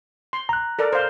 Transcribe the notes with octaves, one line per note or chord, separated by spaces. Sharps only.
C6
A#5 F#6
A4 A#4 D5
C5 F5